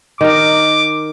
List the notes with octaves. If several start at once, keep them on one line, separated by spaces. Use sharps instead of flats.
D#3 A#4 D6